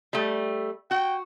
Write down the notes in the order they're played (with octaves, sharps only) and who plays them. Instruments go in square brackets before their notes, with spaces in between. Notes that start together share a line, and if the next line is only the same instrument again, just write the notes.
[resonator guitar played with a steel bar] G3 A3
[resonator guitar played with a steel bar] F#4 [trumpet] G5